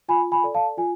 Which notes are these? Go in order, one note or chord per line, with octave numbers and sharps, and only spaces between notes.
F4 G#5 B5
G#5 B5
A4 D5
F5 A5
F4 G#5